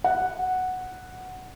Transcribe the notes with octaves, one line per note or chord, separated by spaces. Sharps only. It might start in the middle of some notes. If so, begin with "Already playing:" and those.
F#5